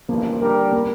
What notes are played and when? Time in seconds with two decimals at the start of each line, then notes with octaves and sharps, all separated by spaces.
0.09 A1 G2 F3 A#3
0.41 D3 G3 D4 G4 A#4
0.72 A#3